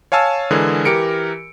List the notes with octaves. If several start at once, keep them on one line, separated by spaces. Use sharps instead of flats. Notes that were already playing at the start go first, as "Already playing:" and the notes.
C#5 F5 G#5 A5 E6
D3 E3 G#3 G#4 A#4
E3 G4 A#4 C#7 D7